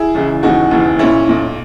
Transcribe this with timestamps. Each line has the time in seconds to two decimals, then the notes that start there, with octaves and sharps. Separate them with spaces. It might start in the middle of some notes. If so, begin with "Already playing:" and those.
Already playing: E4 G#4
0.15 C#2 C#3 E3
0.43 E1 D#2 C#3 E3 D#4 F#4
0.71 E1 D#2 C#3 E3
0.99 B1 A#2 C#4 E4
1.28 B1 A#2